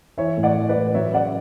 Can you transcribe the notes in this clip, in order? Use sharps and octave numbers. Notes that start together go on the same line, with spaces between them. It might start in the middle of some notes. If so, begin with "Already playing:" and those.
E3 C#5 E5
A2
D5 F#5
E3
B4 D5
A2
F#3 C#5 E5
C#3 D5 F#5